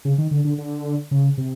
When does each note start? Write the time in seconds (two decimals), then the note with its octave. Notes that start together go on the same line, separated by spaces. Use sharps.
0.05 C#3
0.18 D#3
0.31 D3
0.45 D3
0.58 D3
1.11 C#3
1.38 C3